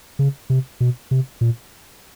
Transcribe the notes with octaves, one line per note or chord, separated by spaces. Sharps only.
C#3
C3
B2
C3
A#2